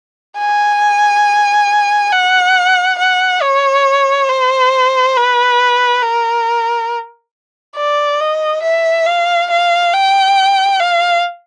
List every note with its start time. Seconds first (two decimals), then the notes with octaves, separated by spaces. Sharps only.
0.38 G#5
2.12 F#5
2.99 F#5
3.42 C#5
4.29 C5
5.16 B4
6.02 A#4
7.76 D5
8.20 D#5
8.63 E5
9.06 F5
9.50 F5
9.93 G5
10.80 F5